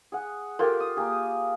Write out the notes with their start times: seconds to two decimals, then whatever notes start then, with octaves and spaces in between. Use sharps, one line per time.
0.12 G#4 F#5
0.59 F4 G4 A4 A#4
0.80 D#6
0.97 A#3 G4 G#4